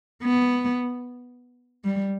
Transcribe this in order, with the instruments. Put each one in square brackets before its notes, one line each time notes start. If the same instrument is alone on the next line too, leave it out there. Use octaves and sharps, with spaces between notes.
[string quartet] B3
G3